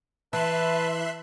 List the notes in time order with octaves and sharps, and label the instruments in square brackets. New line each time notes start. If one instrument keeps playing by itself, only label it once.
[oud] E3 [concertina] B4 A5 [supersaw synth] E5 C6 F#6